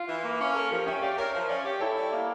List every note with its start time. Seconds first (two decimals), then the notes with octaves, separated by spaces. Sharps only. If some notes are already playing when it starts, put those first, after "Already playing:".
Already playing: F4
0.08 E3
0.24 A#3
0.40 C#4
0.55 A4 A#4
0.70 F3 G4 A#4
0.87 C#4 E5 G5
1.02 G4 D5 F5
1.18 A#4 C#5 E5
1.34 F3
1.49 C#4 D5 F5
1.65 G4
1.80 E4 A4 C#5
1.96 G3
2.12 A#3